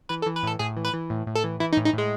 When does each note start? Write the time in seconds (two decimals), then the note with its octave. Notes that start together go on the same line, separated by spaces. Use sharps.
0.09 E3 B4
0.22 A4
0.26 E3
0.36 B4
0.43 A2 A4
0.59 A2 G#4
0.76 E3
0.85 B4
0.93 E3
1.10 A2
1.27 A2
1.35 A4
1.44 E3
1.60 E3 E4
1.73 D#4
1.77 A2
1.85 D#4
1.94 A2 G#3